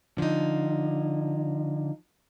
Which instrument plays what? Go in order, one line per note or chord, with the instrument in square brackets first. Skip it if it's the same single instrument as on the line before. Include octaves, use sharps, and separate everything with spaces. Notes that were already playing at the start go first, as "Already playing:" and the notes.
[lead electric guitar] D3 [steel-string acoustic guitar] F3 D#4